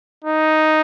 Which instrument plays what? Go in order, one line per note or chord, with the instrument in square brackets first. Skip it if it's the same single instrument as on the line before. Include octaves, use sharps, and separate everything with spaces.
[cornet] D#4